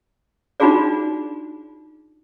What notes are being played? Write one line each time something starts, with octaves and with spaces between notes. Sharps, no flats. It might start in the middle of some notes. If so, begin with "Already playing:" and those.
D4 D#4 F4 F#4 G#4 D5